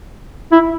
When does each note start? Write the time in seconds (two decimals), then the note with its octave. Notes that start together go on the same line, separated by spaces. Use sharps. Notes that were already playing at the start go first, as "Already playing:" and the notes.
0.52 E4